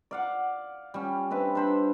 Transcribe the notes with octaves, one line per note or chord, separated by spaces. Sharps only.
D5 F5 F#5
G3 C#4
C4 D4 B4 E5
D4 C5 B5